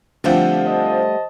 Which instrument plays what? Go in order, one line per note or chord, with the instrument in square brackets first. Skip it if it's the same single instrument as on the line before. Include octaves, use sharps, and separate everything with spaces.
[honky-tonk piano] D3 F3 C4 [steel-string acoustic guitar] G3 A3 F#5
[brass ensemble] C5 D#5 A5